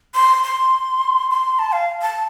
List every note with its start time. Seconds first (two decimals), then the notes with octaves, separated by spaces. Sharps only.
0.15 C6
0.44 C6
1.30 C6
1.59 A5
1.72 F5
2.02 A5